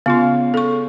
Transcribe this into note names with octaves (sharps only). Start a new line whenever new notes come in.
C#3 B3 F4 F5 C6
A4 C#6